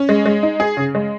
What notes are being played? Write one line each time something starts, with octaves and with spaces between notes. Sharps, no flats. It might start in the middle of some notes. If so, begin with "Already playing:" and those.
Already playing: C#4
G#3
G#3
D#4
G#4
C#3
G#3